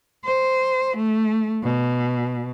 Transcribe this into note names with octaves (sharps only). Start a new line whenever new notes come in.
C5
A3
B2